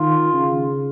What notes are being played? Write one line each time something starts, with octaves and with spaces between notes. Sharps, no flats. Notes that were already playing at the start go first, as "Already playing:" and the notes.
Already playing: D#3 F4
C#3